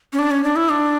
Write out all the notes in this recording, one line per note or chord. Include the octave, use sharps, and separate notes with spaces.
C#4
D4
C#4
D4
E4
D4